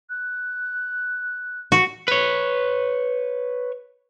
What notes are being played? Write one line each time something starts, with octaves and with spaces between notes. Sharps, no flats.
F#6
F#4
B4 C#5